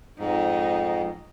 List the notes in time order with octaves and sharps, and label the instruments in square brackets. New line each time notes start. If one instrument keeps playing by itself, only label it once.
[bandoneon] F2 G#2 [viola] D#4